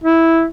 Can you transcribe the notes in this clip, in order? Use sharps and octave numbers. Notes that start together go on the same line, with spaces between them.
E4